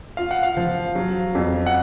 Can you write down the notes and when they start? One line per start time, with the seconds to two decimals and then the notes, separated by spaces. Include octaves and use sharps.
0.17 F4 F5
0.31 F#5
0.43 F5
0.57 F3
0.95 F#3
1.35 F2
1.67 F#5